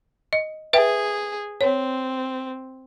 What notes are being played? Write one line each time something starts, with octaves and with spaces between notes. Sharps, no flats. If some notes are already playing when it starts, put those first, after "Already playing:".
D#5
G#4 B4 E5 G5
C4 C#5